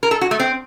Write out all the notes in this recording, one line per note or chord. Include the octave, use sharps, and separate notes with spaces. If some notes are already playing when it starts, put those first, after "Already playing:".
A#4
A4
F#4
A3
C4